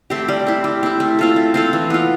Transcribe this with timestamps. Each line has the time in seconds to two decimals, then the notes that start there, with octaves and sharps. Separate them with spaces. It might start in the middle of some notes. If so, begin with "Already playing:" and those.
0.10 A3 C4 G4
0.28 G3
0.47 C4 E4
0.64 G3
0.83 C4 E4
1.00 A3
1.19 C4 F4 A4
1.36 A3
1.54 C4 F4 A4
1.73 E3
1.90 B3 F4